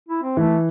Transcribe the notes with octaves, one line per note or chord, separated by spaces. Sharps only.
E4
C4
E3 A3